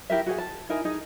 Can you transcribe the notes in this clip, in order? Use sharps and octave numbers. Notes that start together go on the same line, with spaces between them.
E4 G4 A#4 E5
F#4 G#4 F#5
A5
D#4 E4 A#4 G#5
D#4 G#4